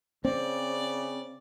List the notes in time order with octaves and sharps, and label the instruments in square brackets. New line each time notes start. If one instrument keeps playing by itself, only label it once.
[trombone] C#3 [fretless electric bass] C4 [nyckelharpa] D5